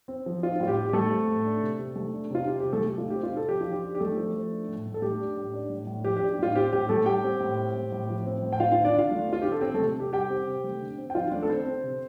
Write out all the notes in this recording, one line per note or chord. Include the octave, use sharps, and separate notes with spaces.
C4
F3
C4 F4
A2 F4
G4
A2
G4
G3 A3 A4
C4
A2
D4
C3
C3
A3
D4
C3 F4
C4 G4
C3 G4
A3 A4
C3 G4
A3 F4
G4
C4
F4
C3
A4
F3 G4
F4
F3
G4
D4
G4
A3 D4 A4
F3
F3
D4
A2
A2
A4
A3 G4
D4
A2
D4
A2
A2
F3 G4
G4
D4
G4
A2 F4
C4 G4
A2 G4
A2 A3 A4
G3 G4 G5
C4
A2
C4
A2
A2
F3
C4
A2
G5
C4 F4 F5
F4 F5
D3
D4 D5
D3 F4 F5
A3
C4
F4
D3 G4
A4
C4 C5
A3 A4
C3
C3 G4
G3 G4 G5
C4
C3
A3
D3
C4
G5
F3 F4 F5
A3 D4 D5
A4
D3 C4 C5
C4
C3